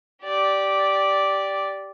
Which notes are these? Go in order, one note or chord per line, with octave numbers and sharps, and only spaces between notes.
G4 D5